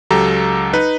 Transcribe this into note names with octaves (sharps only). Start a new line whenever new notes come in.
C#2 F#3 G4 A4 A#5
D#4 B4